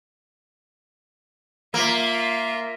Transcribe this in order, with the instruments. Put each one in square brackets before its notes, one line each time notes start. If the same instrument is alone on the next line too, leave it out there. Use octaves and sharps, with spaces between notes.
[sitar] A#3 [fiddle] F4 E5